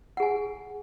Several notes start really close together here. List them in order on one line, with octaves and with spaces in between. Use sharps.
F#5 G#4 G#5